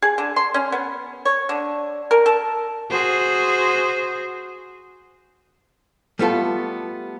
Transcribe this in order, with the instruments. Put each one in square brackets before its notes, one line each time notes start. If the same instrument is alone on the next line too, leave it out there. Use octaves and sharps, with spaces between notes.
[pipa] G#4
D3
C6
C#4
B3
C#5
D3
A#4
A4
[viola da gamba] F#4 G#4 C5
[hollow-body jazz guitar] G3 A3 B3 F4 A4